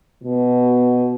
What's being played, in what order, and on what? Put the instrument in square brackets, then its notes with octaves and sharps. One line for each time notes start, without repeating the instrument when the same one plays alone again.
[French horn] B2